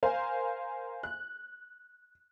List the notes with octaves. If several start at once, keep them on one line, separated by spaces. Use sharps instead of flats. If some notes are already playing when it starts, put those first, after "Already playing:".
A#4 C5 F5 G#5
F#6